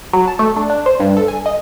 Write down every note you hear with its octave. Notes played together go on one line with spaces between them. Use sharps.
F#3
A5
A3
D4
D4
C5
G2
A4
G#5
D#5